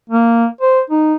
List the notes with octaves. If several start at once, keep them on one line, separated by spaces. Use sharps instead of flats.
A#3
C5
D#4